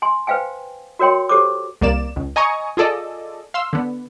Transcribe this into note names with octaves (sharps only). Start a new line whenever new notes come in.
G#5 C6
B4 C5 F5 G5 G#5
F#4 A#4 C#5 G5 C6
G4 A4 C5 C#5 D6
C2 A#3 D5 E7
C#2
D#5 G#5 A#5 C#6 D#6
F4 G#4 A4 D5 D#5
F5 C6 E6
D3 B3